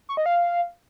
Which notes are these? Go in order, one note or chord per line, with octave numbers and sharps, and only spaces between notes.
C#6
D#5
F5